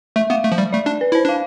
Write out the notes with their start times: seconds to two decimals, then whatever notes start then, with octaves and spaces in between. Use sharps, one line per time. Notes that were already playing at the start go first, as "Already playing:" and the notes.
0.16 A3 E5
0.30 B3 F5
0.44 A3
0.52 F3
0.58 G3
0.73 A3 D5
0.86 D4
1.01 B4
1.12 E4 C5
1.25 D4 F5